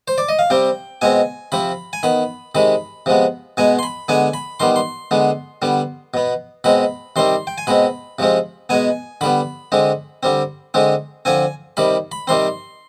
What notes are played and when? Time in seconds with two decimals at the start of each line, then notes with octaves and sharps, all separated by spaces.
0.08 C5
0.18 D5
0.29 D#5
0.39 F5
0.50 C3 G3 C4 G5
1.01 B2 G#3 C4 G#5
1.52 C3 F3 C4 B5
1.93 G#5
2.03 D#3 B3 B5
2.55 C3 D#3 G#3 B5
3.06 C3 F3 G#3 B3
3.57 B2 G#3 B3 G#5
3.79 C6
3.83 B5
4.08 D3 G#3 B3 G#5
4.34 B5
4.60 D#3 G3 B3 C6
4.76 C6
5.11 D3 G#3 B3
5.62 D3 G3 B3
6.14 B2 B3
6.64 B2 G#3 C4 B5
7.16 C3 D#3 G3 C4 C6
7.47 G5
7.58 G#5
7.67 B2 G#3 C4 B5
8.19 C3 F3 G#3 C4
8.69 B2 G#3 B3 G#5
9.21 D3 G3 B3 B5
9.72 D3 G#3 C4
10.23 D3 G3 C4
10.74 D3 G#3 C4
11.25 D3 F3 C4 G#5
11.77 C3 D#3 G3 B5
12.12 B5
12.27 C3 D#3 G3 C4 C6